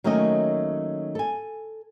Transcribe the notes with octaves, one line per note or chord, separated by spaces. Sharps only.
D#3 F#3 A3 A#3 C#4 D#5
A4 G#5